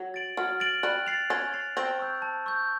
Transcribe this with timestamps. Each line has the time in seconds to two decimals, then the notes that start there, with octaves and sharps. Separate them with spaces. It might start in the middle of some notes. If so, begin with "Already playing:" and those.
Already playing: F#3
0.14 A6 D7 F#7
0.37 F#3 F6
0.60 A6 D7 F#7
0.83 G3 F#6
1.07 A6 C7 F7
1.30 C#4 F#6
1.53 A6 C7 F7
1.76 C4 A5
1.99 C#6 E6 G6
2.22 A5
2.46 C#6 E6 G6